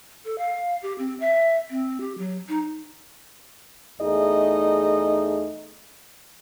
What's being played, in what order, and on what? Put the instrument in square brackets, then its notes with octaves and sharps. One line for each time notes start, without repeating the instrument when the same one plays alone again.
[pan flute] A4
F5
G4
C4
E5
C4
G4
F#3
D#4
[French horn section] E2 A3 D#4 G#4 D#5